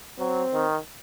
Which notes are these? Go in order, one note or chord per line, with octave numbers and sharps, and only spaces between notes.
F#3 C4
D#3